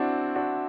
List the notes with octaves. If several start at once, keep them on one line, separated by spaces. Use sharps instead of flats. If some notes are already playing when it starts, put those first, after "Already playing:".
Already playing: C4 D4 E4 F#4
D4 F#4